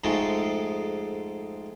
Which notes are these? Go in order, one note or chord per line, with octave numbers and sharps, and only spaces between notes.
F2 G#2 G#3 A3